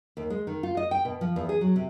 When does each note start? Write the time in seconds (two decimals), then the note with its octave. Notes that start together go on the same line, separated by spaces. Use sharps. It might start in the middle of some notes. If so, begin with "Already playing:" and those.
0.17 D#2
0.30 G#3
0.47 D#3
0.63 F4
0.77 D#5
0.91 G5
1.05 B2
1.21 F3
1.36 E2
1.49 G#4
1.61 F#3
1.76 C3